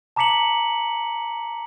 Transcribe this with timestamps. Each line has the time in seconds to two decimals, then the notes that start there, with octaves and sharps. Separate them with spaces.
0.16 A5 A#5 D6 B6 C#7 F#7